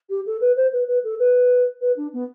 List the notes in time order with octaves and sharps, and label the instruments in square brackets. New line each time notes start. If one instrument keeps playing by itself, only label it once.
[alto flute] G4
A4
B4
C5
B4
B4
A4
B4
B4
D4
B3